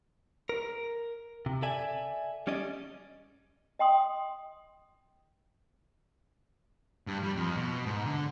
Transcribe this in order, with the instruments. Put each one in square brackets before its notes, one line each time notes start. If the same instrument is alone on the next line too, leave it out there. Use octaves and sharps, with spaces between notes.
[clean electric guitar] A#4
C3
A4 D5 E5 G#5
G3 C#4 D5 D#5
[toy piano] D#5 G5 C6 D#6
[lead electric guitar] G2
G3
F2
B2
G#2
D3